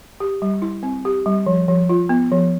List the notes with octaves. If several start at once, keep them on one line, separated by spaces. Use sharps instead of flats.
G4
G3
E4
C4
G4
G3
F3
F3
F4
B3
F3